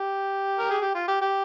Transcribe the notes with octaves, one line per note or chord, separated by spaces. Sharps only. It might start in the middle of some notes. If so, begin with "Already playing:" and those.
Already playing: G4
A#4
G#4
G4
F4
G4
G4